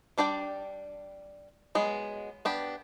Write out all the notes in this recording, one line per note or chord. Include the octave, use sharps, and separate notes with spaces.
G3 D4 D5 G5
F#3 G#3 B3
B3 D4 G4